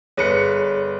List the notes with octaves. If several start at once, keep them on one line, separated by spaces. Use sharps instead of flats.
G1 G#4 B4 C#5 C#7